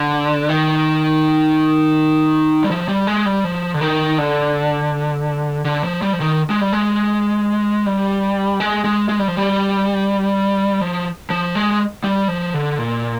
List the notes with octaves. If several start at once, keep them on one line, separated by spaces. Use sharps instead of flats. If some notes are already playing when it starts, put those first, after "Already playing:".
Already playing: D3
D#3
G3
F3
G3
G#3
G3
F3
D3
D#3
D3
D3
F3
G3
F3
D#3
G#3
G3
G#3
G3
G#3
G#3
G#3
G3
F3
G3
F3
F3
G#3
G3
F3
D3
A#2